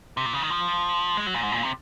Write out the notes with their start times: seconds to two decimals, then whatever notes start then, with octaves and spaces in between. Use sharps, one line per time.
0.17 C3
0.26 A#2
0.33 C#3
0.42 D#3
0.50 F3
1.17 G#3
1.27 F#3
1.34 A#2
1.43 G#2
1.52 A#2
1.63 C3